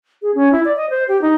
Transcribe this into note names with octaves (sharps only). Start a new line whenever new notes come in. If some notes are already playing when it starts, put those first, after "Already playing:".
G#4
C#4
E4
D5
D#5
C5
G4
D#4